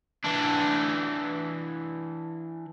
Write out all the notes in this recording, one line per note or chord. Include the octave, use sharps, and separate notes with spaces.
E3 D4